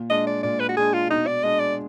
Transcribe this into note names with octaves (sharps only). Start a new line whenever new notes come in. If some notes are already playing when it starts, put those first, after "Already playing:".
Already playing: A#2
G#3 D4 D#5
D5
A#2 D5
B4
F#4
G#3 D4 G#4
F4
B2 D#4
D5
G#3 D4 D#5
D5